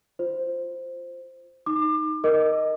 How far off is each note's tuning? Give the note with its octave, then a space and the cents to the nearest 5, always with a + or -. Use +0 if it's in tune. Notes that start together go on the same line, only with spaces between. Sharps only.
F4 +0 C5 +0
D#4 +0 D6 +30
A#4 +0 D#5 +0 D6 +0